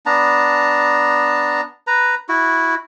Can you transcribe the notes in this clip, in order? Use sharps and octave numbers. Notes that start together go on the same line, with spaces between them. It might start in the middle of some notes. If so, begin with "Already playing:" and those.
B3 D4 A5 A#5
B4 A#5
E4 F#4